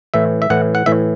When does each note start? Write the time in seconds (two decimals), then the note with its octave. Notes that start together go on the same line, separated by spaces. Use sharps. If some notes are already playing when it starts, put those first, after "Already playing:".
0.14 A2 E3 E5
0.42 E5
0.50 A2 E3 F#5
0.75 F#5
0.86 A2 E3 E5